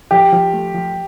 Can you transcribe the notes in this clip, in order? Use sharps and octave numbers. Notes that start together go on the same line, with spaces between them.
F3 G4
F3
A3
F3